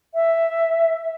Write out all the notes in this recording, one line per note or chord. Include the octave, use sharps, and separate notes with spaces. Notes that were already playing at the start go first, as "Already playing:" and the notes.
E5